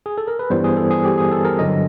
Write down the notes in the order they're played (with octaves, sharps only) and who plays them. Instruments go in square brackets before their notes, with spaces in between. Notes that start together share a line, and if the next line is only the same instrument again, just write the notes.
[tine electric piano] G#4
A4
A#4
B4
G2 E3 G3 B3 C5
G#4
A4
G#4
G4
G#4
A4
A#4
G2 D3 F#3 D#5